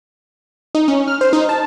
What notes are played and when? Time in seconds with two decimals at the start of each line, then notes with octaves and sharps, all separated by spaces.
0.75 D#4
0.88 C#4
1.08 F6
1.21 C5
1.33 D#4
1.49 A5